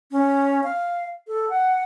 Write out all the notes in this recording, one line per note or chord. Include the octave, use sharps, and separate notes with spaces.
C#4
F5
A4
F#5